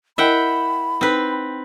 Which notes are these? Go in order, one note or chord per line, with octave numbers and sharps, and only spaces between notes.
E4 A#4 D#5 E5 F#5 G5 B5
C4 D#4 B4